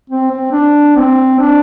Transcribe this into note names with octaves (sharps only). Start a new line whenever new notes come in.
C4
C4
D4
C4
D4